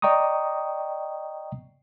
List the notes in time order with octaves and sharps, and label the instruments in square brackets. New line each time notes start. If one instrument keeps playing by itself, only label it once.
[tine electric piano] D5 D#5 G5 A#5 C#6 D#6